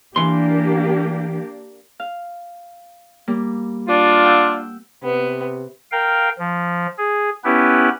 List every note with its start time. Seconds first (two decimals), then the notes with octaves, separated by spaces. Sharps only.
0.16 E3 A#3 D4 G4 C6
2.00 F5
3.28 G3 A#3
3.88 D4 F4
4.24 F#5 G5 E6
5.03 C3 B3
5.92 A#4 F5 G5
6.39 F3
6.98 G#4
7.44 B3 C#4 E4 G4 B4